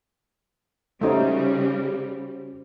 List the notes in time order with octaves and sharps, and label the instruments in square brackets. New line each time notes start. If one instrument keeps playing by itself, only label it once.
[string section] C#3 G3 [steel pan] A3 D#4 [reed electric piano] C#4 F#4 C5